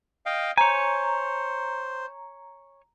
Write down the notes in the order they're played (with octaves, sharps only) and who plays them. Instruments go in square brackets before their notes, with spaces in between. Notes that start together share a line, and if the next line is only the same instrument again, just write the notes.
[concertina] D#5 F5 G5
[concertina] C5 [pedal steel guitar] C#5 G#5 [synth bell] A#5